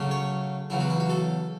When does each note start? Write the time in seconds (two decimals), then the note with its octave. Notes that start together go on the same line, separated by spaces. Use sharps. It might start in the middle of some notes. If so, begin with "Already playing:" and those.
Already playing: C#3 F#3 A3 C#4
0.11 C#5
0.70 E2 C#3 F#3 E4
0.80 F#4
0.90 E4
1.00 F#4
1.09 A4